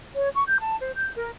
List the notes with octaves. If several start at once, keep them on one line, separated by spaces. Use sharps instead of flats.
C#5
C#6
G6
A5
C5
G6
A#4